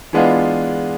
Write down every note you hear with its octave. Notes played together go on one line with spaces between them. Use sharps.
E3 G#3 B3 D4 F4